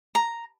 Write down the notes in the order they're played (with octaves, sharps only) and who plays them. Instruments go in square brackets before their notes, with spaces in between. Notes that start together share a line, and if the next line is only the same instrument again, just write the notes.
[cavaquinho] A#5